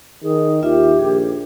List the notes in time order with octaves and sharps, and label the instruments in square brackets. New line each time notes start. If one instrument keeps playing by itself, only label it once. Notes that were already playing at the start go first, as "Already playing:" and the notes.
[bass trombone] D#3 [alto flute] G#4
[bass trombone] D#2 [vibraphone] F4 E5 [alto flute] G4
[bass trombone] A#1 [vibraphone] G#4